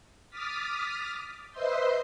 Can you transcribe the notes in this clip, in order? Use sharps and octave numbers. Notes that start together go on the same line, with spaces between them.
D6 D#6 F6 A6 B6
B4 C5 D#5 E5 C6 G6